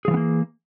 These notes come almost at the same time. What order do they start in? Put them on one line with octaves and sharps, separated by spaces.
G#4 F3 E3 B3 A#3